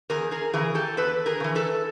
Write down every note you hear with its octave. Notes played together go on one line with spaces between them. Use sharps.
E2 G#4 A#4
G#4 A#4
C#3 E3 G#4 A#4
G4 A4
E2 A4 B4
G#4 A#4
C#3
E3
A4 B4